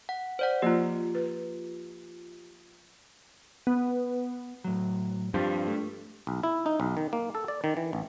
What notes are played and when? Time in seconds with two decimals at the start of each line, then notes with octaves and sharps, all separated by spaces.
0.09 F#5
0.39 C5 D5 F#5
0.62 F3 A#3 F4 G4
1.15 B4
3.67 B3
4.64 A2 F#3
5.34 G2 F3 C4 F4
5.68 A3
6.27 B1
6.43 E4
6.66 D#4
6.80 B1
6.97 D#3
7.13 A#3
7.35 A4
7.48 D5
7.64 D#3
7.77 E3
7.93 A1